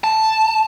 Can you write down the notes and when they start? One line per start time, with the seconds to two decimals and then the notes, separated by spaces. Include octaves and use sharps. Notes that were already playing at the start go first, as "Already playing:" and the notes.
0.04 A5